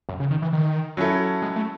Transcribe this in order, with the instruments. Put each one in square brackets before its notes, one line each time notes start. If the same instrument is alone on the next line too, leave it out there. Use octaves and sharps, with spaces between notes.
[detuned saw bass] F#2
C#3
D#3
E3
D#3
[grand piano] F#3 C#4 E4 A4
[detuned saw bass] G#3
A3